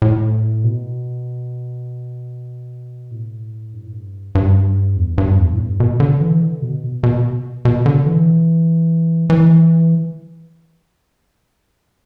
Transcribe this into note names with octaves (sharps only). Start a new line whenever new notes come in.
A2
B2
A2
G2
A2
G2
G2
E2
G2
E2
A2
G2
B2
D3
E3
D3
B2
B2
B2
D3
E3
E3